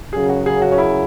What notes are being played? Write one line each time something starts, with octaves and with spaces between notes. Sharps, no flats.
F#2 C#3 F#3 G#4
F#4
G#4
F#4
C#4
E4